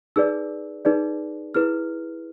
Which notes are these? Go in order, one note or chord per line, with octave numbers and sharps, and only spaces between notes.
D#4 G#4 B4 D5 E6
D#4 G#4 B4 D5
E4 G#4 B4 F6